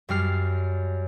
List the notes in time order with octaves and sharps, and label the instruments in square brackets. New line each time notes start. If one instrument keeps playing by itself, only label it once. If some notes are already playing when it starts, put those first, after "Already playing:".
[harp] F#2 G3 F6 C7